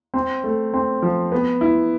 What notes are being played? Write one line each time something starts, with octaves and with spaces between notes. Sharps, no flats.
C4
A3
C4
F3
B3
E4